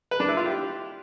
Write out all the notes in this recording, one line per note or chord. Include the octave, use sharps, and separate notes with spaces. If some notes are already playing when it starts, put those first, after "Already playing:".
B4
D4
E4
F4
G4